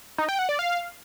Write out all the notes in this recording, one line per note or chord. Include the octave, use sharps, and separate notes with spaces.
D#4
G5
F#5
D5
F5